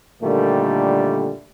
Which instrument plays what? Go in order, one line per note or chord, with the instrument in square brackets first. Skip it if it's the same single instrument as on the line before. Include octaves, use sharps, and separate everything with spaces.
[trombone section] A#2 D3 D#3 G3 A3